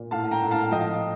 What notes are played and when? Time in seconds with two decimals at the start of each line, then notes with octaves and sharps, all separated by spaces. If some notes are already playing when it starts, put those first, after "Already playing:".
Already playing: A#2
0.11 A2 F5 A5
0.31 G5 A#5
0.42 A2
0.51 F5 A5
0.71 F3 D#5 G5